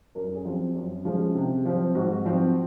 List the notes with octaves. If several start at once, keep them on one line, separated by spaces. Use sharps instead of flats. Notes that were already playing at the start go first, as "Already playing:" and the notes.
F#2 A#4
G#4
F3 C4
F#2
C#3 F3 G#3
C3
F3 C4
G#2 F#4
F3 C4